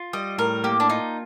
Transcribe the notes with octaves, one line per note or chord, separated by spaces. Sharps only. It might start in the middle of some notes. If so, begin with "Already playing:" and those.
Already playing: F4
G3 D#5
A2 A#4
A#3 G4
D4
D#4 F4